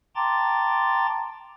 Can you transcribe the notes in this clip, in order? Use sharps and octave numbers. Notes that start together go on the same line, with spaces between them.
G5 A5 A#5 C6 D6 A6